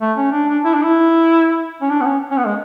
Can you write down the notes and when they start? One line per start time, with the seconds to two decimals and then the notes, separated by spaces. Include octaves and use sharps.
0.01 A3
0.17 C#4
0.32 D4
0.48 D4
0.65 E4
0.74 D4
0.84 E4
1.82 C#4
1.90 D4
2.01 B3
2.06 C#4
2.31 C#4
2.38 B3
2.46 G#3